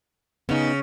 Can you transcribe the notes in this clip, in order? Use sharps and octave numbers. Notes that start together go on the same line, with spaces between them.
C#3 B3 D#4